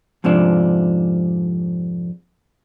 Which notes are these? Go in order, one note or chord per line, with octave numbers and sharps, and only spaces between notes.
F2 G#2 C3 F3 D4